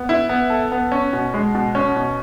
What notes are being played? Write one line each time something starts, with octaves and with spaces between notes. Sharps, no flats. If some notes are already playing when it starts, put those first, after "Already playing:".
Already playing: B3
E4
B3
A4
B3
C#4
B2
G#3
B2
C#4
B2